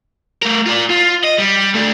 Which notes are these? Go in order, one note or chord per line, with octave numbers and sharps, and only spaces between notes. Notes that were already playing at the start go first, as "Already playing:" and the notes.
A3 A#4
F4 D5
F4
D#5
G3
A3 D4